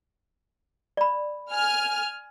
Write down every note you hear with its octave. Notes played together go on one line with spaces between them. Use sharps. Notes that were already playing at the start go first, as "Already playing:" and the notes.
D5 B5
G#5 F6